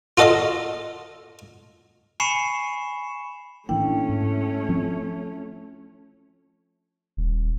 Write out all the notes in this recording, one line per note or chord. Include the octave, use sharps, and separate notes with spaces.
F4 F#4 A4 D#5 F5 D#6
G#5 B5 C#6 C7 C#7 E7
A2 E3 A3 A#3 C#4 D4 E4 G5
G#2
F3 C4
D#1